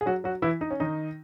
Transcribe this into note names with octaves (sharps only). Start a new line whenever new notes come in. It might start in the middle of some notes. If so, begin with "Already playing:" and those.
G#4
F#3 F#4
F#3 F#4
E3 E4
D#4
C#4
D#3 D#4